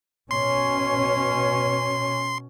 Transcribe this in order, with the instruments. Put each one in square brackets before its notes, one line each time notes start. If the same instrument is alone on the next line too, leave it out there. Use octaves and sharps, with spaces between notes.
[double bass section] B2 C#4 [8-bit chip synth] C6